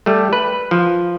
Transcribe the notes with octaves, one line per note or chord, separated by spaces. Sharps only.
G3 A3
B4
F3